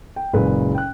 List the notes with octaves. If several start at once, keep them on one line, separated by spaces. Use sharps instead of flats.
G5
F#1 A#2 G#3 B4
G5 F#6